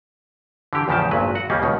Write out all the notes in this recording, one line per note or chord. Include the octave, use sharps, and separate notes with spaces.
D3 E3 G4
E2 A2 C#3 F3 G4 A5
G#1 G2 A#2 F#3 B4
F#4 F#5
D#2 C#3 G3 A#3 C#4
C#2 B2 D#3